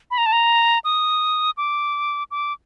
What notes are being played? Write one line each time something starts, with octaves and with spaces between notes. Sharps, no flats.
B5
A#5
A5
A#5
D#6
D6
D6